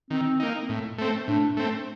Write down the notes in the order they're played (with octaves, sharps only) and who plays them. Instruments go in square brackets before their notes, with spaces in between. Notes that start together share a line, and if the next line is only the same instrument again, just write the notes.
[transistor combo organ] D#3 [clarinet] C4
[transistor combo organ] A#3 D#4
A2
A3 C4
[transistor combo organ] A2 [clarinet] D4
[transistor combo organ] A3 C4